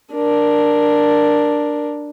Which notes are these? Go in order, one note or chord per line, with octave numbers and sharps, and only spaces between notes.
D4 A#4